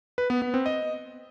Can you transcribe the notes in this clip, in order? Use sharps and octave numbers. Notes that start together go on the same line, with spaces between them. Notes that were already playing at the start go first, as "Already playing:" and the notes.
B4
B3
B3
C4
D#5